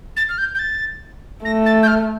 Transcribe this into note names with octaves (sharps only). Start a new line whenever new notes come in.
A6
F6
G6
G6
A6
A3 A#6
A6
G6
F6